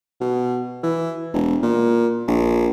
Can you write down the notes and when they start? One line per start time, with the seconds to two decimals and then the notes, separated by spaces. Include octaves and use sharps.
0.21 B2
0.83 E3
1.33 E1
1.63 A#2
2.28 A#1